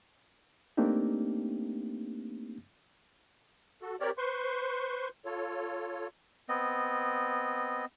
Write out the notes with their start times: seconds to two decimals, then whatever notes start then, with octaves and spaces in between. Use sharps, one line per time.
0.77 A3 A#3 C4 D4 D#4 G4
3.82 F#4 A4
4.00 C4 G4 A#4 C#5 D5
4.18 B4 C5 C6 C#6
5.25 F4 A4 C#5
6.49 B3 C4 D#5